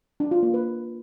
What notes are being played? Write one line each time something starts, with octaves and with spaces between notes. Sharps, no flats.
D4
F4
A#3
B4